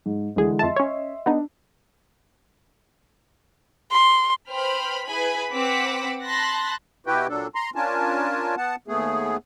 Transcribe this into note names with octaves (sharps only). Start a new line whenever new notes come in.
G#2
D2 D3 E3 G#3 G#4
F2 D#5 E5 A5 C6
C#4 C#5
B3 D4 D#4
C6
B4 C5 G5 B5 F6
E4 G#4 B4 G#5 B5
C4 B4 F#5 D6 E6 B6
A5 B5 C6 F#6 A6 A#6
B2 E4 F#4 G4 B4 G5
A#2 F#3 D4 A4
A#5 C6
C#4 D4 F4 A#4 G#5 A5
B3 F#5 A5
D#2 A3 B3 G#4